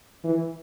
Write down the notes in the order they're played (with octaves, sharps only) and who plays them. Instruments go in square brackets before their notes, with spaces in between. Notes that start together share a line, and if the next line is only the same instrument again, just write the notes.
[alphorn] E3